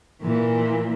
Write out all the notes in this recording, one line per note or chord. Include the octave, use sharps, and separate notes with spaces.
A#2 E3